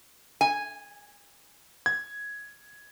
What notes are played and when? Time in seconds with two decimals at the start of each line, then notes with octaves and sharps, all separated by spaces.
0.41 G#5
1.86 G#6